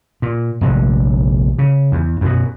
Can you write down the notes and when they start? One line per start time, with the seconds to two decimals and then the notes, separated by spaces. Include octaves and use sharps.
0.22 A#2
0.61 F1 A#1 D3
1.59 C#3
1.92 E2
2.21 F#2 B2